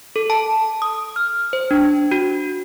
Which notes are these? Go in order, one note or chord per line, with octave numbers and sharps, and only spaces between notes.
A4
A5
D#6
F6
C5
D4
F#4